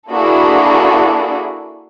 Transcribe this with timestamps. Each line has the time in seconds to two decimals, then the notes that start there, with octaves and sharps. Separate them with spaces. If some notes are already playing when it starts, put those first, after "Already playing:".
0.10 A#3 D4 E4 F#4 G#4 A4